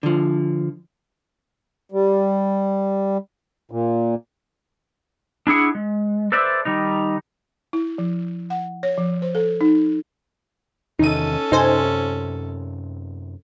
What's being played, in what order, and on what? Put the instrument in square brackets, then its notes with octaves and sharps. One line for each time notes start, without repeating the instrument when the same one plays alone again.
[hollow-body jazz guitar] D3 F3
[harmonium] G3
[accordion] A#2
[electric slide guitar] D4 E4 G#4 F#5
G#3
A4 B4 C5 D5 E5
D#3 G3 D#4
[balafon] E4
F3
F#5
C#5
F3
C5
A4
D#4
[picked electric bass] E2 C3 D#3 [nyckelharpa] C#4 A4 [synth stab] D#4 D#7
[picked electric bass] F#2 C3 [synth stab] D#4 C5 G#5